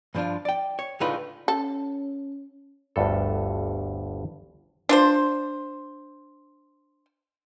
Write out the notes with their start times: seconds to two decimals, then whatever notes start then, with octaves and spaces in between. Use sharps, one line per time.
0.15 G2 F3 D4 F4
0.45 D5 G5
0.79 C#5
1.00 C#2 A2 D3 D#4 F4 B4
1.48 C#4 A4
2.96 G1 D2 G2 A4
4.89 D4 F4 C5